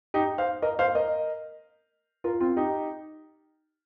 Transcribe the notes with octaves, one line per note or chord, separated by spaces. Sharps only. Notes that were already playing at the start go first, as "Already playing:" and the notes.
D#4 G4
C5 F5
A#4 D#5
C5 F5
A#4 D#5
F4 A#4
C4 F4
D#4 G4